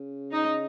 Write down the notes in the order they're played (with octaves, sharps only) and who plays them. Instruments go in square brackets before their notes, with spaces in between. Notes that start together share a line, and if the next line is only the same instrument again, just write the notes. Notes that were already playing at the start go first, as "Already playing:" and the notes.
Already playing: [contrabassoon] C#3
[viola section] D#4